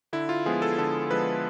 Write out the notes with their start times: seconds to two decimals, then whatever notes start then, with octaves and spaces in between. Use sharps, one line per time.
0.13 D3 E4
0.29 F4
0.46 F3 G#3 B3 G#4
0.62 A4
0.78 D3 A4
1.11 F3 G#3 B3 B4